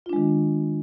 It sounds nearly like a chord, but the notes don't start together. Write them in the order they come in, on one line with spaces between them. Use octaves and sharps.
F4 D4 G#3 D#3